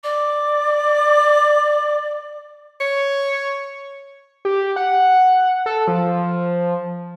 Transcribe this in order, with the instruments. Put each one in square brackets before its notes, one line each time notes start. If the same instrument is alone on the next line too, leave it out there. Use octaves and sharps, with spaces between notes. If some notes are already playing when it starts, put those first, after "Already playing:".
[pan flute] D5 [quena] D6
[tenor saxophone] C#5
[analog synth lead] G4
F#5
A4
F3